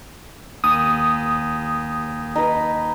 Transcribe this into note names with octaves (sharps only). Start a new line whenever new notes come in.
D#2 D#6
D#4 B4